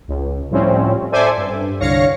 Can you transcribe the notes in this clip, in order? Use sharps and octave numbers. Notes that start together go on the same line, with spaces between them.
C#2
A2 F3 G3 C4 C#4
A4 C5 D5 E5 G#5
G2
C2 D3 C#5 F5 A#6 C#7